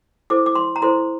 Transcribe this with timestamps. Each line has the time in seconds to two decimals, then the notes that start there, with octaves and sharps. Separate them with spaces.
0.30 E4 A4 C5 D6
0.46 D6
0.55 C6
0.76 A#5
0.82 E4 A4 C5 C6